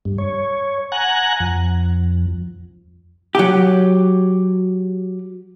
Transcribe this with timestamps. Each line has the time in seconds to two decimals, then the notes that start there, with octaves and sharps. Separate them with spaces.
0.05 G2
0.18 C#5
0.92 F#5 G#5 A#5 F#6
1.40 F2
3.35 F#3 G4